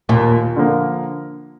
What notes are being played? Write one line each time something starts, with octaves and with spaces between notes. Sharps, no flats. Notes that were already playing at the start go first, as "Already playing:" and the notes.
D#2 A#2
D3 F3 A#3